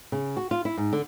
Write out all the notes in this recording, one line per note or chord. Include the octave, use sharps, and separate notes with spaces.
C#3
F#4
F4
E4
G#2
D3